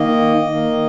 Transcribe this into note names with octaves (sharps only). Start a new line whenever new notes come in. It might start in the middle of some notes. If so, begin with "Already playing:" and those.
Already playing: D#3 A#3 D#5
D#3 A#3